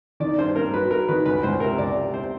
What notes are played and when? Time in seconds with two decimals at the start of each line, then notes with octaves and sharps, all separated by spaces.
0.20 D#3 D5
0.38 G2 C5
0.55 G2 A#4
0.74 F#3 B4
0.91 F#3 A#4
1.08 D#3 B4
1.26 C#2 B4
1.43 C#2 C5
1.60 C3 A#4
1.78 C#2 D5
1.95 C3
2.14 C3 C5